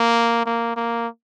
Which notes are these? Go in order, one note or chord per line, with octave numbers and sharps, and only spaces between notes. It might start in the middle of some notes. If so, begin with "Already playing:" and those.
Already playing: A#3
A#3
A#3